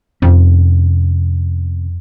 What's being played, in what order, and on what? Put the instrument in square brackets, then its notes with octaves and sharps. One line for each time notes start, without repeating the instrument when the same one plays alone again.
[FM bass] F2 [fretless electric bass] C3 C#4